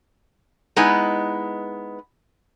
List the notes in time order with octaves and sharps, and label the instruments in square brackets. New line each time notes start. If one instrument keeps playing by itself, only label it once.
[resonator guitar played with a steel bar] G#3 B3 D#4 E4 B4